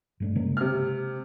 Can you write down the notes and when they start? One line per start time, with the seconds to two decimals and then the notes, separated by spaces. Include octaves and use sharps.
0.20 G2 A3 D4
0.35 C#3 G#3 A#3
0.57 C3 F6